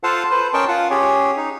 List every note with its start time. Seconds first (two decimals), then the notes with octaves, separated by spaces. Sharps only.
0.04 F4 A4 C5 F5 F#5 A5
0.31 B4 C5
0.54 C#4 A#4 D#5 G5 A5 C#6
0.68 F4 F#5
0.90 C#4 G4 G#4 C#5
1.37 D#4